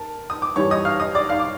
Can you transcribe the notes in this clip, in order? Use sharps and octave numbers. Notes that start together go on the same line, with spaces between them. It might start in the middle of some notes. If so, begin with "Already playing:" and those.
Already playing: A#4 A5
D#6
D6
G2 E3 G3 C#5 C#6
D#5 D#6
F5 F6
D#5 D#6
D5 D6
F5 F6
D6